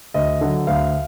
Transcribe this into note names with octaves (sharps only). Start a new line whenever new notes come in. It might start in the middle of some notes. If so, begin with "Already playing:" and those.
D2 D#5
D3 F#3
D2 F5